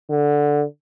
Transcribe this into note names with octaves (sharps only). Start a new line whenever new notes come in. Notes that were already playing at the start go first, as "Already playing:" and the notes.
D3